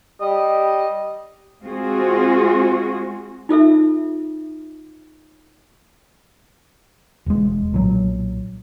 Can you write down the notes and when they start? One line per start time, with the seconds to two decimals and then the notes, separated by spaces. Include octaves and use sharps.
0.21 G3 D#5
1.62 G#3 C4 F4 F#4 G#4
3.49 D#4 F4 A4 E5
7.26 E1 G#3
7.72 B1 A#2 F#3